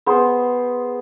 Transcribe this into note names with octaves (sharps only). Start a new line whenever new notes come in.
B3 G#4 C5